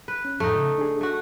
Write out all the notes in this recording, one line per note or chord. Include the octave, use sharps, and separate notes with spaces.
B4
C#4
F2 A2 A3 D#4
C#3
D4 G#4
A3 F#4